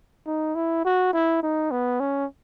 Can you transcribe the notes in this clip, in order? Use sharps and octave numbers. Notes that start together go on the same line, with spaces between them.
D#4
E4
F#4
E4
D#4
B3
C#4